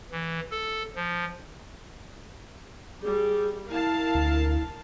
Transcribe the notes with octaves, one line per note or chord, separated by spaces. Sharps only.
E3
A4
F3
G3 G#4
E4 A#4 F5 A5
D2